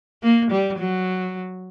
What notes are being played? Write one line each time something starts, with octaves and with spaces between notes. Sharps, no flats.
A#3
G3
F#3